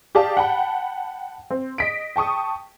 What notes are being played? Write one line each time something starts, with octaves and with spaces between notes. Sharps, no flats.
G4 G#4 D5 F5 A5
F#5 G5 A5 B5
C4
D#5 B6 D7
G5 A5 C#6 D#6